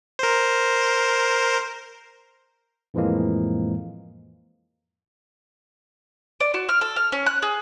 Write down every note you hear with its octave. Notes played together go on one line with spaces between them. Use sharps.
A#4 C5
F2 A2 E3 F3 G#3 A#3
D5
F#4
F6
A4
F6
C#4
F#6
G#4